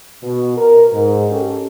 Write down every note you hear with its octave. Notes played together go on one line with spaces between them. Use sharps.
B2
A#4
G#2
C#4 G4 A4